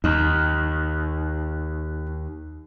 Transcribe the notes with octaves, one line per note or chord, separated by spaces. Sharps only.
D#2 D#4